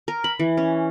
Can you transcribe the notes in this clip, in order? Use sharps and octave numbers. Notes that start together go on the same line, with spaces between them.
A#4
B5
E3
C#4